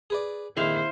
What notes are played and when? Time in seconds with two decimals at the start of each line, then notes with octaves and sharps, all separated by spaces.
0.10 G#4 B4 D5
0.57 A#1 F2 D#3 E4 C5 F5